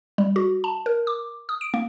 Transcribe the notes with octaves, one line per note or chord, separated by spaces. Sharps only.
G3
F#4
A5
A#4
D6
D#6
D7
A#3